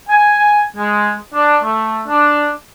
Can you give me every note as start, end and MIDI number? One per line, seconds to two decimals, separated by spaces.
0.09 0.61 80
0.77 1.13 56
1.34 1.58 62
1.64 2.02 57
2.08 2.50 62